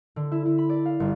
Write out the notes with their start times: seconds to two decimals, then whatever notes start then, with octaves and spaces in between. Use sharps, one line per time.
0.16 D3
0.32 E4
0.46 E4
0.58 B5
0.69 D5
0.86 F5
1.00 G1